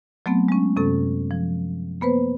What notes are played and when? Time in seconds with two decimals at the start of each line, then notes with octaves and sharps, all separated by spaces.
0.26 F#3 A3 B3 C4
0.48 G#3 C#4
0.76 F#2 C3 C#4 A4
1.31 F3
2.01 A#3 B3 B4 C5